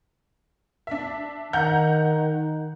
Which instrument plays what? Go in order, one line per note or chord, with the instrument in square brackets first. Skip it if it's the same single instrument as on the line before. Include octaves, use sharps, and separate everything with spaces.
[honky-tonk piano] D4 E5
[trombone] D#3 [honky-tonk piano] F#5 A#5 G6